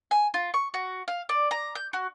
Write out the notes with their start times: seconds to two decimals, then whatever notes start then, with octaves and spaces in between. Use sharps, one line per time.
0.11 G#5
0.34 F4
0.54 C#6
0.74 F#4
1.08 F5
1.29 D5
1.51 A#5
1.75 G6
1.93 F#4